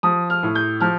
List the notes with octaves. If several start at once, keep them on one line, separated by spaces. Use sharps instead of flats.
F3 D#6
F6
A2
G6
F3 F6